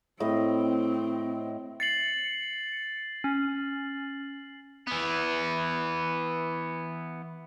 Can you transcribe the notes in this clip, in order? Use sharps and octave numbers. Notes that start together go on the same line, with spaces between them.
A2 C4 D#5
A6 C7 C#7 F#7
C#4
E3 B3